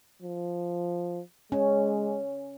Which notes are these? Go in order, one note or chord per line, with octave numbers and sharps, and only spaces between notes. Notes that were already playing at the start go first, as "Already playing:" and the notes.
F3
G#3 C#4